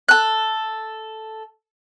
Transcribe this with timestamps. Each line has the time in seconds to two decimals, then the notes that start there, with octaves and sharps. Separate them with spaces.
0.08 A4 F#6